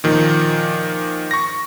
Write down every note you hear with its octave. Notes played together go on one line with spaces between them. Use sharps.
A#2 D#3 F3
C#6 A#6